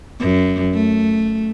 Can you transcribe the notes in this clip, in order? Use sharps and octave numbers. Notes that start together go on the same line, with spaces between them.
F#2
A3